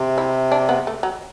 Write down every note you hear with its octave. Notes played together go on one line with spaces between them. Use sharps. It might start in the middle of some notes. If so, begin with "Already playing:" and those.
Already playing: C3
E4
D4
B3
A3
F#3